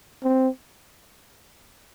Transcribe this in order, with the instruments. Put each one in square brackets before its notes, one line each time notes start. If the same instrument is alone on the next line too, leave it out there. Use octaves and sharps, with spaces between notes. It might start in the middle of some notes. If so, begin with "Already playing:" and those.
[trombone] C4